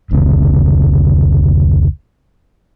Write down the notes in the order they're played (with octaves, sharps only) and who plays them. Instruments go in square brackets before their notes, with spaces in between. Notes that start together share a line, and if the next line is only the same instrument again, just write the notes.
[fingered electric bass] F1 C#2 C#3